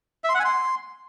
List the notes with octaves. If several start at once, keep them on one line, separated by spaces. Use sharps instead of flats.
E5
C6
F#5
G#5
C6